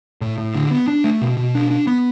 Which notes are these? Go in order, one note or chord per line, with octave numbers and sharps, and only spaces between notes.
A2
A2
D3
B3
D4
A3
B2
B2
D4
D4
B3